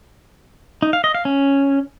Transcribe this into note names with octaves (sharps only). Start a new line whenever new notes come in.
D#4
F5
D#5
F5
C#4